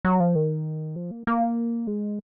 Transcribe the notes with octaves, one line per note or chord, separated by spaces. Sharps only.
F#3
F3
D#3
F3
A#3
A#3
G#3